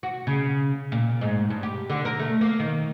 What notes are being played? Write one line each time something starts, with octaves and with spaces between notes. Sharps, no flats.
F#4
C#3
A#2
G#2
G2
G4
D3
A#4
A3
A#3
D#3